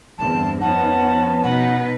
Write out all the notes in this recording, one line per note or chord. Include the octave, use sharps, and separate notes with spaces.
E2 G2 D3 C4 A5
F2 B3 C#4 D#4 F#5 A5
B2 D#4 B4 F#5